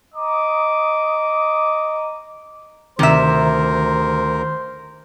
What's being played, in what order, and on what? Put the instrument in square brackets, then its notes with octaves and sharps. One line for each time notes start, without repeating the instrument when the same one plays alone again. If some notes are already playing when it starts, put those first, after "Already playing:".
[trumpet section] D#5 A#5 D6 D#6
[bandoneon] D2 A#4 [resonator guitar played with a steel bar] C3 E5 [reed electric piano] D#3 A#5 [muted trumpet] C5